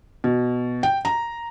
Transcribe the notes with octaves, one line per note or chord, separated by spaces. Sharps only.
B2
G5
A#5